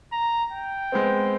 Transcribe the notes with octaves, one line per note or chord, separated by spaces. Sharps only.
A#5
G5
G#3 B3 C4